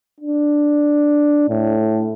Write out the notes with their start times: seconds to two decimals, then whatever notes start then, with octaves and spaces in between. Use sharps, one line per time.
0.20 D4
1.49 A2